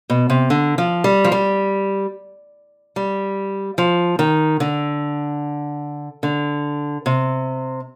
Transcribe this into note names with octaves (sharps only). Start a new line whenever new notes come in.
B2
C3
D3
F3
G3
F3
G3
G3
F3
D#3
D3
D3
C3